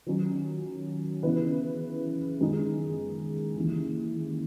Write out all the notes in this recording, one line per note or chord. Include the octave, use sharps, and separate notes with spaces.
D#3 F#3 C#4
C#3 E3 B3 E4 B4
F#2 D#3 G#3 D#4 G#4
D#2 C#3 E3